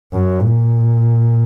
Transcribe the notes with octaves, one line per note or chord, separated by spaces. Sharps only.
F#2
A#2